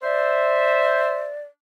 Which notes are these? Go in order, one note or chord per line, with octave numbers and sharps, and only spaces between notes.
C5 D5 E5